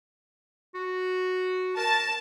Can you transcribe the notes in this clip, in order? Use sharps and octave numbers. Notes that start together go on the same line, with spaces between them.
F#4
A#4 A5